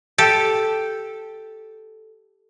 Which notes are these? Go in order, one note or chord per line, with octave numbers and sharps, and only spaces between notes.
G4 A4